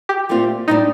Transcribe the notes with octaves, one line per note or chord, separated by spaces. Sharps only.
G4
A#2 A3 C4 F4
A2 G3 D4 D#4